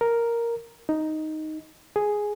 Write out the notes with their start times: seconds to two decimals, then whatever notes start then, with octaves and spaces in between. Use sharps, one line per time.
0.01 A#4
0.89 D#4
1.96 G#4